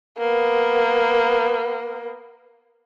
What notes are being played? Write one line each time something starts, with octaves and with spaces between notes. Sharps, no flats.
A#3 B3